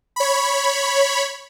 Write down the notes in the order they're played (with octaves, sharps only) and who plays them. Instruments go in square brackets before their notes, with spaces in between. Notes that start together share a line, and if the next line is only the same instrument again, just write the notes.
[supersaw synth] C#5 B5